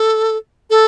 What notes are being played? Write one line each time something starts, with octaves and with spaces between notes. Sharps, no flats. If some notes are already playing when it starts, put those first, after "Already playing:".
Already playing: A4
A4